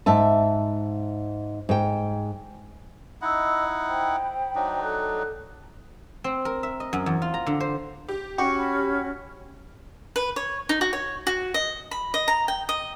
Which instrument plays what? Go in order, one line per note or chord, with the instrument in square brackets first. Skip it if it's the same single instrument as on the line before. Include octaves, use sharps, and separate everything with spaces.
[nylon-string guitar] G#2 E5 A5
G#2 G5
[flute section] C#4 D#5 E6 [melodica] D#4 E4 F#5
[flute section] C5 G5 B5
[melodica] F#3 D4 D#4
[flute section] A4 F#6
[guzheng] C4
A#4
E5
D#5
F#2
E2
F4
A#5
D3
C5
[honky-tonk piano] G4
[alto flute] C#4 [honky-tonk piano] F#4 [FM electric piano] G4 [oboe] C#6
[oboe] B5
[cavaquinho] B4
C#5
D#4
F#4
C#5
F#4
D#5
B5
D#5
A#5
G5
D#5